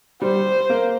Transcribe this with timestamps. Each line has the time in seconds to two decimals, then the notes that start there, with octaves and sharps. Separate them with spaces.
0.22 G3 C5
0.70 A#3